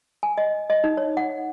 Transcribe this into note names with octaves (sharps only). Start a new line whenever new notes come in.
G#5
D#5
D#5
D#4
C#5
F#5